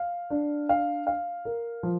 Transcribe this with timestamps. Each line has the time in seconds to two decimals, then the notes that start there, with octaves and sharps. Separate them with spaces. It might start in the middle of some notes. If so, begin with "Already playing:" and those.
Already playing: F5
0.30 D4
0.69 F5
1.07 F5
1.45 A#4
1.83 F3